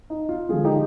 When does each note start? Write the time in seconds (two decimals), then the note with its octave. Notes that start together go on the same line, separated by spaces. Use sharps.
0.10 D#4
0.29 F4
0.49 D3 F3 G#3 F4 G#4
0.65 D#4 G4